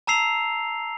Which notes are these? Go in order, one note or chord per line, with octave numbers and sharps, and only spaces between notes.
A5 A#5 E6 C7 F7